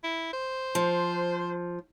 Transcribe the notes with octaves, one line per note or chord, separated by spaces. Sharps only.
E4
C5
F3